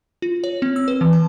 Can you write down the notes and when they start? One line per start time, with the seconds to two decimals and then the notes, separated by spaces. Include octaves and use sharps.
0.22 F4
0.44 C#5
0.62 C4
0.76 E6
0.88 B4
1.01 E3
1.13 A5